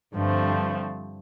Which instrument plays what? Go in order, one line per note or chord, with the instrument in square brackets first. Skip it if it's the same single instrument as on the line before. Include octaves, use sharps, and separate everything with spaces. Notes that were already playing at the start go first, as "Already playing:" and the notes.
[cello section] G2 [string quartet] D3 F3 A3 C4